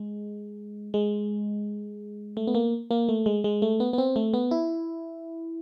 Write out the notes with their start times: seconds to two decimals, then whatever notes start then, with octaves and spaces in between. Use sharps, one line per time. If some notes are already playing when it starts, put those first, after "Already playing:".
Already playing: G#3
0.94 G#3
2.37 A3
2.47 B3
2.55 A#3
2.91 A#3
3.09 A3
3.26 G#3
3.44 G#3
3.62 A3
3.80 B3
3.93 B3
3.98 C4
4.16 A3
4.34 B3
4.51 E4